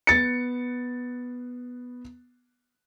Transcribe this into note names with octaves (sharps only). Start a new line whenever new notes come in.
B3 A6 C#7